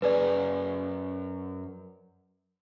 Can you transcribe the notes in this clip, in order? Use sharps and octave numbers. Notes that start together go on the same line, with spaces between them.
F#2 G#4 B4 D5